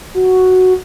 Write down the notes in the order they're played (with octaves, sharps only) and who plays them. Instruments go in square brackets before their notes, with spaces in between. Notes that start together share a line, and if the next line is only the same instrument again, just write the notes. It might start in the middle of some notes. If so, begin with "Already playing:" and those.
[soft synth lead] F#4